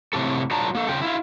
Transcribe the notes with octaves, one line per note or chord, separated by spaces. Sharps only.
A2 C3 G4 A4
F#3 F4 D5 A5 A#5
A#3 A4
C#3 F4 G5
E4 F4